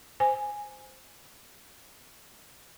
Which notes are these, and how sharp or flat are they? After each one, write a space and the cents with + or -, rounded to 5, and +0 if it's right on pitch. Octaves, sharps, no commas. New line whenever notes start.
C5 +0 G#5 +0